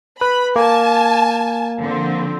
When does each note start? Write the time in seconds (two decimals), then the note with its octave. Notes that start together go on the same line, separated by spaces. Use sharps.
0.21 B4 B5
0.56 A#3 G#5 A5
1.84 D3 F3 C4